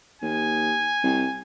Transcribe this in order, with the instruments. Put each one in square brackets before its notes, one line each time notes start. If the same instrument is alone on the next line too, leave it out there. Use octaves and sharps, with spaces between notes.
[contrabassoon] D#2 [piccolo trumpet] G#5
[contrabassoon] C2